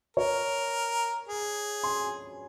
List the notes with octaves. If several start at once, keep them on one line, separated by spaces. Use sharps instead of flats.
A#4 C#5
G#4
G#5 C6